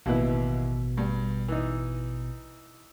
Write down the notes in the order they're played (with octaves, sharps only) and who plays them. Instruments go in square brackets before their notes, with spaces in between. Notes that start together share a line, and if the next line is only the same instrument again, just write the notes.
[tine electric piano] A1 B2 [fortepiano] D#2 E4 B4
[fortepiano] G2
E3 D#4